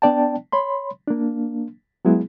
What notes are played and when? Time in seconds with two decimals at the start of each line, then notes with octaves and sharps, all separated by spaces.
0.02 B3 D4 D5 G5 A5
0.52 C#5 B5 C6
1.07 A#3 D4
2.05 F#3 G#3 B3 E4 G#4